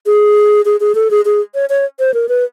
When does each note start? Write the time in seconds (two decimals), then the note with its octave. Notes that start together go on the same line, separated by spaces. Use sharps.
0.06 G#4
0.65 G#4
0.80 G#4
0.95 A4
1.11 G#4
1.25 G#4
1.55 C#5
1.70 C#5
1.99 C5
2.14 A#4
2.29 B4